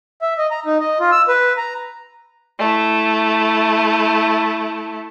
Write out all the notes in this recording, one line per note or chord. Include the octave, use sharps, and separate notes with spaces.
E5
D#5
A#5
D#4
D#5
F4
E6
B4
A#5
A3 E4